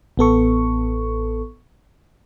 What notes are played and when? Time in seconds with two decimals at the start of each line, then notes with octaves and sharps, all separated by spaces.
0.17 A1 B3 A4 C#6